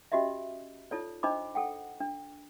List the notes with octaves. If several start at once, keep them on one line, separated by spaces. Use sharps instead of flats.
C#4 F#4 G4 D#5 E5
D#4 F4 A4 C#5 D5
D4 D#4 C5 D#5 B5 D6
A4 F#5 G5
D4